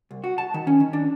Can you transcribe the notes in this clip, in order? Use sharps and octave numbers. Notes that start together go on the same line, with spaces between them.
C2
F#4
A5
D#3
C#4
D#3
D4